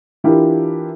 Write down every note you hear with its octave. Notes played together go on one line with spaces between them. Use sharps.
E3 D4 E4 F4 G4 A#4